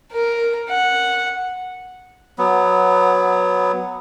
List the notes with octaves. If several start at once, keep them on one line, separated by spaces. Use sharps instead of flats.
A#4
F#5
F#3 B3